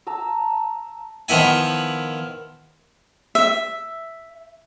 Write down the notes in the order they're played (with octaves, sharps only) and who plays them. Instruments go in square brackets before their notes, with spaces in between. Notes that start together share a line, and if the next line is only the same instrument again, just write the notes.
[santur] A5 A#5 E6
[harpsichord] D#3 F3 B3 E4 G#5
[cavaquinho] E5